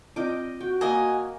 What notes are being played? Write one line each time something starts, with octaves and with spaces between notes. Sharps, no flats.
C4 F4 D5 D#5 G5 D6
F#4 G5
A#3 D#5 G#5